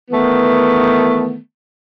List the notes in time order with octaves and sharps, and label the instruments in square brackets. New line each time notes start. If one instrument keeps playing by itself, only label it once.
[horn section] D#3 E3 A3 B3